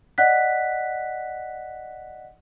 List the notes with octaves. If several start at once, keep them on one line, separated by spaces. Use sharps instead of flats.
D5 D#5 F#5 F#6 B6